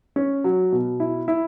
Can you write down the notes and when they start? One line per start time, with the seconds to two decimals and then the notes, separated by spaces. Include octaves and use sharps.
0.16 C#4
0.44 F#3
0.72 B2
1.00 E4
1.28 E4